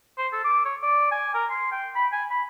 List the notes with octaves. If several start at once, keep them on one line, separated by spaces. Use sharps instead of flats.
C5
A4
D6
C#5
D5
G#5
A#4
C6
G5
B5
G#5
B5